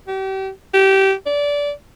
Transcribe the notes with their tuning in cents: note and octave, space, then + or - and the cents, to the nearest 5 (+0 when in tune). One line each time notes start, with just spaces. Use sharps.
G4 -35
G4 -20
D5 -20